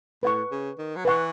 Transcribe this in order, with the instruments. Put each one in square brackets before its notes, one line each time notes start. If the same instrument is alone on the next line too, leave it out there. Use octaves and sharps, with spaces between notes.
[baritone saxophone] A2 [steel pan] B4 F#5 C#6
[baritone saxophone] C#3
D#3
F#3
[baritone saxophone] E3 [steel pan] B4 F#5 C#6